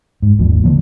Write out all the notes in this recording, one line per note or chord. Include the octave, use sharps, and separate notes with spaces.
G#2
G#1 D#2 F3
D3 F3 A#3